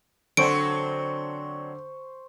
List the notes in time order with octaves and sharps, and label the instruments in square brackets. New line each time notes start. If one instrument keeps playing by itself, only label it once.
[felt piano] D3 [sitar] F#3 C4 D4 [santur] C5 C#6 [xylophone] D7